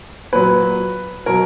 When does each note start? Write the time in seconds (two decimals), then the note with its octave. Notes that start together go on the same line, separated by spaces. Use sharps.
0.33 A#2 F#3 B4
1.26 B2 F#3 A#4